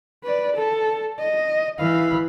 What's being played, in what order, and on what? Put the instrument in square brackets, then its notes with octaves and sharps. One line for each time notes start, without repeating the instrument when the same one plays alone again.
[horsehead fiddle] B4 D5
A4
D#5
[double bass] E3 [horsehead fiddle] F5 B5